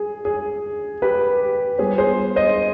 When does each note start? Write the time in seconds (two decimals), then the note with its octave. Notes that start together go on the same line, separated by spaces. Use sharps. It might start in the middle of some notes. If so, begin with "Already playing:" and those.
Already playing: G#4
0.25 G#4
1.02 G4 B4
1.78 G3 B3 F4 G#4 C5
1.98 G#4 C5
2.36 C5 D#5